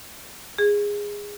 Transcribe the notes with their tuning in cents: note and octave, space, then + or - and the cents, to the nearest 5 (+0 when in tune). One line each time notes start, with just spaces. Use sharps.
G#4 -15